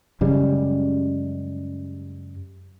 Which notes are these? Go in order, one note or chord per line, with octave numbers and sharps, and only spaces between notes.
F#2 C#3 G3 G#3